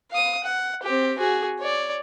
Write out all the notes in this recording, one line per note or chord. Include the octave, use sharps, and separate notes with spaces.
F5 D#6
F#5
C4 G4
F#4 G#4
C#5 D5